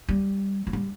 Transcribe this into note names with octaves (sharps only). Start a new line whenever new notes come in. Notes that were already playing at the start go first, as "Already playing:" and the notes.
G3
F3
G3